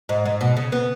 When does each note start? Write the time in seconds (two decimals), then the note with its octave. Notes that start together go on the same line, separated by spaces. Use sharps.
0.09 G#2
0.25 G#2
0.41 B2
0.57 C#3
0.72 B3